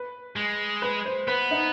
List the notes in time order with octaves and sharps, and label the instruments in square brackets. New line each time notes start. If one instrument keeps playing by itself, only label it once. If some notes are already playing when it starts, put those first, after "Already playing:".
Already playing: [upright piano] B4
[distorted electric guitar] G#3
[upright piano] B4
C5
[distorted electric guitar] B3 [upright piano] B4
[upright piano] D#4